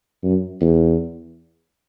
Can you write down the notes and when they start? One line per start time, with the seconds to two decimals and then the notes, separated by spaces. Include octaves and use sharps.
0.23 F#2
0.61 E2